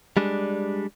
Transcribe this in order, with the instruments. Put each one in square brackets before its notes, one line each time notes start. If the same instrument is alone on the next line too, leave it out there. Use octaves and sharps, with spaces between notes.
[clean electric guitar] G3 G#3 D4